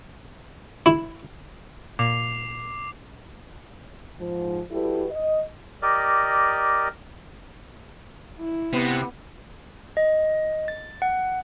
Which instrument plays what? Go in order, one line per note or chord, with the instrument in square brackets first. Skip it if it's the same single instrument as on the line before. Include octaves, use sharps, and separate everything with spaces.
[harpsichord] E4
[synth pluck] A#2 [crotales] D6 C7 F7
[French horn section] G#2 F3
G3 E4 F#4 G4 A4 B4
D#5
[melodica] G4 A#4 D5 D#5
[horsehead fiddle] E4
[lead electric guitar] C3 [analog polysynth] B3
[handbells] D#5
A6
F#5